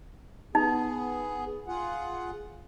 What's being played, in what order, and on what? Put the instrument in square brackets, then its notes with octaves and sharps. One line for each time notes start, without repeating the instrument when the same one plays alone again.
[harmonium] B3 G#4 [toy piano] D#4
[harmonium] F4 G#4 F#5